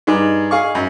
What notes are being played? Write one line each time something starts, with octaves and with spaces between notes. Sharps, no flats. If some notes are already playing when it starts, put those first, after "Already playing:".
G2 D#4 G#4
G#4 F5 C#6
F#2